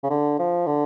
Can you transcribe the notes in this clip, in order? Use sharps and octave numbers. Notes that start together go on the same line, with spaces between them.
C#3
D3
F3
D3